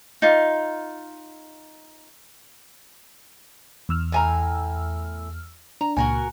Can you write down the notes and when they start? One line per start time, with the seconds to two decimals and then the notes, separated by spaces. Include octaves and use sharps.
0.22 D#4 F4
3.89 E2 E6 F6
4.12 A2 G#5 A#5
5.81 D4 A#5
5.97 C#2 A#2 F#4 A#4 G#5